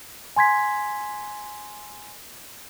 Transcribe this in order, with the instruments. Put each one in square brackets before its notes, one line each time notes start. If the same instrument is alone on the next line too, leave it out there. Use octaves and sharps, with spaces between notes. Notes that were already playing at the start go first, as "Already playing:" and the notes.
[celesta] G#5 C6 G#6 B6